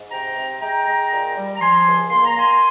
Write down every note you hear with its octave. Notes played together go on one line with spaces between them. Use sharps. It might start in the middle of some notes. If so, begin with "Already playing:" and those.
Already playing: G#2
C3 G5 A#5
C3
G#3 G5 A#5
G#3
A#2
G3
A#5
F3 G#5 C6
C#2
A#3 C6
A#5
A#3 G#5 C6